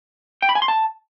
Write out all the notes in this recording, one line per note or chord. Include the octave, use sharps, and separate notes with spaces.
G5
B5
G#5
C6
A5